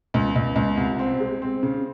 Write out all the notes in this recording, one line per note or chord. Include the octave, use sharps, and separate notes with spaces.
C#2
C#2
C#2
C2
C4
G#3
C4
C#3